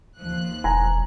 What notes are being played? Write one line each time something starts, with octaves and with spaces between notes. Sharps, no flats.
D#2 F3 F#6
E1 G#5 A#5